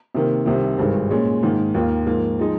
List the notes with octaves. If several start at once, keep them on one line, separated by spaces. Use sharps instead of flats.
C3 D#3 A#3
C2 C3 D#3
G#1 G2 D#3 G#3
A#2 G#3 C#4
G#2 D#3 A#3
D#2 D#3 A#3 F4
G#2 F3 A#3
F3 G#3 D#4